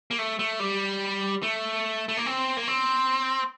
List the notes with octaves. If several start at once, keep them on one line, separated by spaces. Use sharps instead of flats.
A#3
A3
A3
G3
A3
A3
A#3
C4
A#3
C4